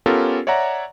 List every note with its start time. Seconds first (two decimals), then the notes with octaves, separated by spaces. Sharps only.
0.06 B3 C#4 F4 G4 A4 A#4
0.47 C#5 D5 E5 F#5 A#5